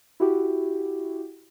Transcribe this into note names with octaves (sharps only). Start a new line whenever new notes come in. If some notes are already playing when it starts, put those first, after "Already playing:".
E4 F#4 G4